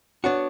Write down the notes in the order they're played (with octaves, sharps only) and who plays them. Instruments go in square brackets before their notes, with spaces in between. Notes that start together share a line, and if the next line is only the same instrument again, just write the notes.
[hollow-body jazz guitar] B3 D4 F#4 [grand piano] C#5